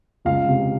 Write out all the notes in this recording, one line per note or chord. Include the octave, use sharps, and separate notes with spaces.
C#2 F5
C3